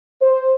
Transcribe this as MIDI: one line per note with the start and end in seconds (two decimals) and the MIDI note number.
0.22 0.54 72